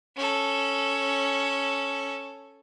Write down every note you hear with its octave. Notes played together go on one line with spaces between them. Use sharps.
C#4 A4